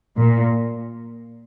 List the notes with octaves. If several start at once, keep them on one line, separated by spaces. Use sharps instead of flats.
A#2